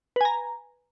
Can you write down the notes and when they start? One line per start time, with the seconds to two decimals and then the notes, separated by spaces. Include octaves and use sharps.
0.16 B4
0.21 G#5
0.25 A#5